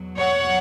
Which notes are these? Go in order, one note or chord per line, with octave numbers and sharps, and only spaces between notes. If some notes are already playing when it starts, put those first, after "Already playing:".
Already playing: E2 B2 F#3
C#5 F#5